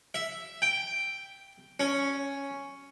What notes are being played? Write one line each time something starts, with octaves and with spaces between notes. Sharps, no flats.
E5
G5
C#4